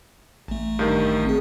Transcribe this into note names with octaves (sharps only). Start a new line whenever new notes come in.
A1 A3
G2 D#3
C4 G#4